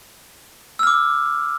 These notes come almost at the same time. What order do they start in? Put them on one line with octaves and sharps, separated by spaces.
E6 F6 D6